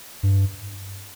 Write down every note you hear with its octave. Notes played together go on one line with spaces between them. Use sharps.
G2